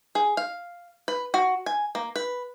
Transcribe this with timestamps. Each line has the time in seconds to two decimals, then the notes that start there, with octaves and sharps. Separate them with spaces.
0.15 G#4
0.37 F5
1.08 B4
1.34 F#4
1.66 G#5
1.95 A#3
2.16 B4